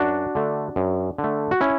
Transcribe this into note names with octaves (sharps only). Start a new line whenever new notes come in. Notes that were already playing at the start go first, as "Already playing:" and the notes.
Already playing: F#2 D4 F#4
D3 A3
F#2
D3
A3
F#4
C#4 E4